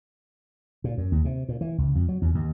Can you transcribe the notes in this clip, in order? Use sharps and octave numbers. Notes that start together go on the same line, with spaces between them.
A#2
F#2
D#2
C3
A#2
E3
C#2
F2
F#3
E2
D#2